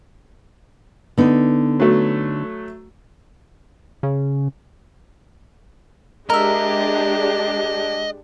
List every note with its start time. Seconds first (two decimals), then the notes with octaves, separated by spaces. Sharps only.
1.18 D3 B3 D#4
1.80 F#3 A3
4.03 C#3
6.30 G#3 D4 G4 A#4 D#5 E5